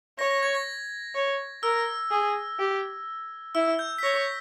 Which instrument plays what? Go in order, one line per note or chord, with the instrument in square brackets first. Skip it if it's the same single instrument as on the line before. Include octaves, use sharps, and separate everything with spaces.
[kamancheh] C#5 [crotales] A#6
[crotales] A#6
G#6
A#6
[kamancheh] C#5
[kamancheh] A#4 [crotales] E6
[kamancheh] G#4
G4
[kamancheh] E4 [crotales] E6
[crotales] G6
B6
[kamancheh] C#5 [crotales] A#6